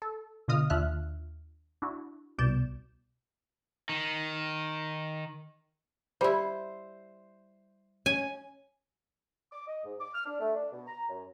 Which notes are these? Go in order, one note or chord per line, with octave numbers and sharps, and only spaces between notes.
A4
B2 D3 F4 D#5 D#6 F6
D#2 D4 F4 E5 F6 F#6
D4 E4 F#4
C2 B2 D5 G6 E7
D#3
G3 E4 C5
C#4 G#5
D6
D#5
G#2
D6
F6
D4
A3
D4
B2
A#5
F#2